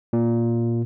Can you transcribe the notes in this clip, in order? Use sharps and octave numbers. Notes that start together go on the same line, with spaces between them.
A#2